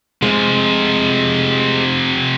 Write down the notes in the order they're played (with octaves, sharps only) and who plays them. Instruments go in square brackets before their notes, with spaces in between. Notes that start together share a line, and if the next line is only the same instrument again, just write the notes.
[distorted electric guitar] C3 F3 [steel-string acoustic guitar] G#3